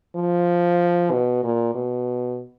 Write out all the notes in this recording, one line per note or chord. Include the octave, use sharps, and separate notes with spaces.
F3
B2
A#2
B2